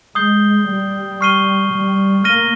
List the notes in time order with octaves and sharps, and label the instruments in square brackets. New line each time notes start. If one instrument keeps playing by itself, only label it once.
[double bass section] G#3 [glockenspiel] D#6 G6 C7 G7
[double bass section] G3
[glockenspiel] C#6 F6 C7 D#7 G7
[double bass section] G3
[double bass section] A#3 [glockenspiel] F6 A#6 D#7 G7